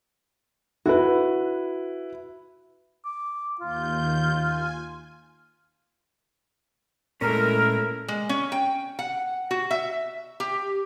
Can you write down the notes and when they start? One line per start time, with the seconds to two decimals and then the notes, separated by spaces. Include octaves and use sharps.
0.86 E4 F#4 B4
3.05 D6
3.61 D#2 F4 G6
4.39 G#5
7.21 A#2 G#3 A3 C#4 E4 A#4
8.08 G#3
8.29 C#4
8.52 G5
8.99 F#5
9.51 F#4
9.71 E5
10.40 G4